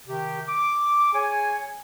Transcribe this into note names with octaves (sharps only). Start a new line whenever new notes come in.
C3 D#3 G4
D6
G#4 C#5 G#5